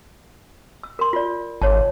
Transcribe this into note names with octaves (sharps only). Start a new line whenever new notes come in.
E6
A#4 C6
F4 D5
G#1 C#5 A5